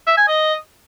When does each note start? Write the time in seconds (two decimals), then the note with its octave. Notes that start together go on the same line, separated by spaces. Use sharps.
0.07 E5
0.17 G#5
0.28 D#5